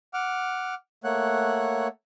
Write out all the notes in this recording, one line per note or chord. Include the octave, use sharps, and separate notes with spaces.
F#5 D6 F6
A3 A#3 C#5 F#5 F#6